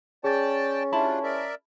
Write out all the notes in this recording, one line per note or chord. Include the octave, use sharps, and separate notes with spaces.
C#4 G#4 D5 G5 A5 A6
G3 D4 E4 F4 A5 B5
A#4 D5 E5